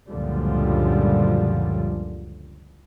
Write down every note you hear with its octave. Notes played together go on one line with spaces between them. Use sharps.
C#2 F#2 A#2 D3 F3 G3